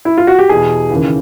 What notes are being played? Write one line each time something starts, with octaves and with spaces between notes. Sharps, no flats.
E4
F4
F#4
G4
E2 B2 G#4
D#2 C#3 E3